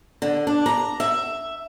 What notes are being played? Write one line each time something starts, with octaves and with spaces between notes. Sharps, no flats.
D3
D4
A#5
E5